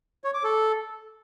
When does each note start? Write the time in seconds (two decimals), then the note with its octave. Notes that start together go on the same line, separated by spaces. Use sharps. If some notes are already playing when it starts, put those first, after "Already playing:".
0.24 C#5
0.34 D6
0.44 A4